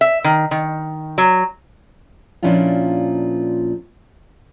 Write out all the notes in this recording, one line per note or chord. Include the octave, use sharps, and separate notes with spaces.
E5
D#3
D#3
F#3
A#2 F3 C#4 D4 E4 F4